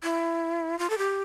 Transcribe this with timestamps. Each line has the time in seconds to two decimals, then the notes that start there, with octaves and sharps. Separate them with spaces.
0.03 E4
0.79 F4
0.90 A4
0.98 G4